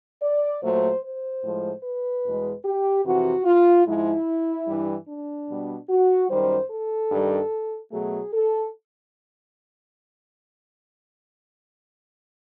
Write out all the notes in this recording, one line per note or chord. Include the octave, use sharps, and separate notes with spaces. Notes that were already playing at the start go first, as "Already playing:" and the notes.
D5
A#2 F#3 A3 C5
C5
A2 F3 G#3
B4
E2 B2 G#3
G4
F2 C3 E3 F#4
F4
G#2 F3 G#3 E4
G2 E3 G3
D4
B2 G3
F#4
F#2 D#3 G3 C5
A4
G2 D#3 G3
B2 F#3 A3 G#4
A4